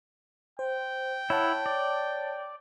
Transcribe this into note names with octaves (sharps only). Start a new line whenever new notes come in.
C5 G5
E4 C#5 F#5 A5
D5